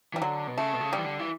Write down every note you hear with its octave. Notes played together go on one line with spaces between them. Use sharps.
E3 G3
D3 F#3
B2
C#3 A3
B2
C#3
G3
E3
D3
E3